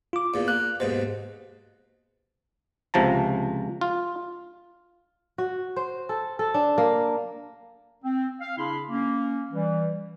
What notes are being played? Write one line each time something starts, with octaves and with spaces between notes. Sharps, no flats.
F4 D6
E2 A#2
A#3 F#6
D#2 G#2 B2 C5
C#2 C3 F3 A5 A#5
F4
F#4
C5
A4
A4
D4
A#3
C4
F5
C#3 D4 E4 B5 C6
A#3 C#4
E3 G3